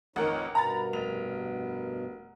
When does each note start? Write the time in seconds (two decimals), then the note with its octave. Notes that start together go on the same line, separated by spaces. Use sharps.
0.16 A1 F2 D#3 D#4 A#4 C#5 F#5
0.55 G2 B2 B3 A#5 B5 A6
0.93 F1 F7